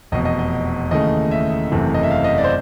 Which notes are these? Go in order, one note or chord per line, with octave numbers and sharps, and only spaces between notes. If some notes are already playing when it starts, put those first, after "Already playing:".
F1 E2 B2 D#5
D#5
D#5
D#2 C#3 E3 A3 D#5
E5
F#1 E2 C3 E3 A3
D#5
E5
F5
D#5
D5
C5